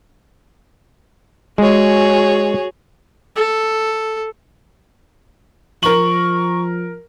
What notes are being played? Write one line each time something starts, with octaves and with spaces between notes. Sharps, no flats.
G#3 F#4 G#4 C#5
A4
F3 A#4 C#6 F#7